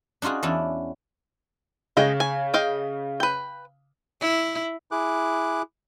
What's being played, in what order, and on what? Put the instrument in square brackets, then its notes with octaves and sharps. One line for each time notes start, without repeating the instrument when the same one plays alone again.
[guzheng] D4 D#4 F4 F#4 G#4
E2 C#4 D4 E4 A5
[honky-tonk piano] C#3 [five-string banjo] G#3 D#5 G5
[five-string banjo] G#5
D#5 F5 G5
B4 G5
[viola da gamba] E4
[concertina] E4 G#4 D6 F#6